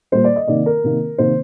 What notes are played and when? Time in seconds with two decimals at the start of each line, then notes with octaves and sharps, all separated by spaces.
0.12 A#2 G3 A#3 C5
0.24 D5
0.36 D#5
0.48 C3 D#3 A#3 D5
0.66 A#4
0.84 C3 D#3 A#3
1.18 C3 D#3 A#3 C5